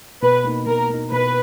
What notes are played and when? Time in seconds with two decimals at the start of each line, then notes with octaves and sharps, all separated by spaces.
0.22 B2 B4
0.44 A#3 D#4
0.66 B2 A#4
0.90 A#3 D#4
1.12 B2 B4